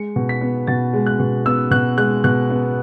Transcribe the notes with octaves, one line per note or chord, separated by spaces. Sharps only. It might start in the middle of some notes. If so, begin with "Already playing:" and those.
Already playing: G#3 C#7
B2
B6
B3
B2 A6
G#3
F#6
B2
B3 E6
B2 F#6
G#3 F#6
B2 F#6
B3